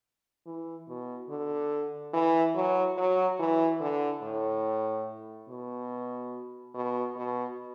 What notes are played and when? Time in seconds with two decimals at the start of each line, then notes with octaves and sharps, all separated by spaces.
0.46 E3
0.88 B2
1.29 D3
2.13 E3
2.55 F#3
2.97 F#3
3.39 E3
3.80 D3
4.22 A2
5.48 B2
6.74 B2
7.16 B2